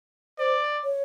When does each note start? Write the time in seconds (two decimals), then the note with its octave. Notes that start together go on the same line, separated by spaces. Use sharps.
0.39 C5 D5
0.84 C#5